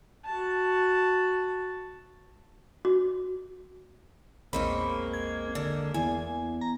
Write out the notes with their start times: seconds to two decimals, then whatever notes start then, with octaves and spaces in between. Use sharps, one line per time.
0.25 F#4 A5
2.85 F#4
4.53 A#1 E2 G#3 A#3 C4 D#4 C#5 B5
5.13 G#6
5.55 D3
5.94 E2 E4 G#5
6.61 A#5